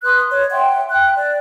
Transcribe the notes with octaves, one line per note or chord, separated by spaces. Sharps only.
B4 C6 D#6 F#6
C#5 D#5
E5 F#5 G5 C6
G5 F#6
D5